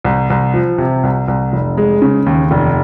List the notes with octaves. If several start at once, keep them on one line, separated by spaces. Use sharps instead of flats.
C2
C2
F3
C3
C2
C2
F1
G#3
C#3
D#2
F1